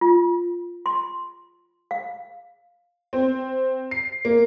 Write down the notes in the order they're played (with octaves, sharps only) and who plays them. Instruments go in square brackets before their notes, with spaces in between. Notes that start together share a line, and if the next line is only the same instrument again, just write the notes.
[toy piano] F4
C6
F5
[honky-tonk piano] C4
C7
A#3